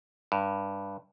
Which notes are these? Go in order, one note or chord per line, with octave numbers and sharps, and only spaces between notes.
G2